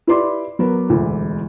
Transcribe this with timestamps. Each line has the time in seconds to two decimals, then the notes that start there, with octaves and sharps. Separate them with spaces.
0.07 E4 G4 B4 D5 C6 D6
0.59 F#3 B3 A#4 B4
0.89 E1 D2 E3 E4